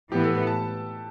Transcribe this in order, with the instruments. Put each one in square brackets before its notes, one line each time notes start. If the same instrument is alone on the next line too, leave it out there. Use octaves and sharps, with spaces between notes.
[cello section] A2 E3 B3 [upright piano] G4
[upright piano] A4
B4
A5